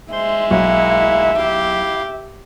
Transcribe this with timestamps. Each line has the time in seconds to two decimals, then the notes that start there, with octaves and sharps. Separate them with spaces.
0.12 G#3 C5 E5 C6
0.51 B1 A#3 E4 F#5
1.38 E4 G4 F5 D6